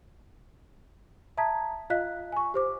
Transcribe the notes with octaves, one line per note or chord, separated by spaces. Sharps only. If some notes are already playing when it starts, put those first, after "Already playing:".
E5 A5 A#5 D#6 G#6 B6
F4 D#5 F5 F#6 B6
G#5 C#6
G4 C5 D6